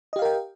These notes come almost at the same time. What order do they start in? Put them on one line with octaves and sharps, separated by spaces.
D#5 G4 F5 A#4 G5